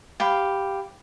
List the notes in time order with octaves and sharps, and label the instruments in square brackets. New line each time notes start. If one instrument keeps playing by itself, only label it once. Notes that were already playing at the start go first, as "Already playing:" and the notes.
[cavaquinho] G4 F5 B5